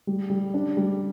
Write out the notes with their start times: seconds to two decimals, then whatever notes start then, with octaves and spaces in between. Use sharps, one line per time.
0.07 G3
0.30 G3
0.54 D4
0.77 G3